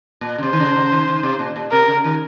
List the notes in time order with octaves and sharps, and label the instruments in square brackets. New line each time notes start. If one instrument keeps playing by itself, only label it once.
[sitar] A#2
C#3
[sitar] C3 [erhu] C5
[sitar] D#3
C#3
C#3
D#3
D#3
C3
A#2
A#2
[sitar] C3 [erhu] A#4
[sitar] C#3
D#3